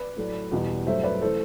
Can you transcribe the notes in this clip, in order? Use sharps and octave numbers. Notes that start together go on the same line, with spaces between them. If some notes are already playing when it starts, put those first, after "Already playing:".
Already playing: B4 D5
A2 F#3 A3
E2 B2 G3
G2 F#3 A3 C5 E5
B4 D5
E3 A3 A4 C5